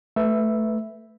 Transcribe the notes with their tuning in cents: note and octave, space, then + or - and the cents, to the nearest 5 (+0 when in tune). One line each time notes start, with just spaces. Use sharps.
A3 +0 B4 +5 E5 +0